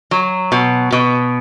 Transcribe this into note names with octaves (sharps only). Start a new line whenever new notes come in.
F#3
B2
B2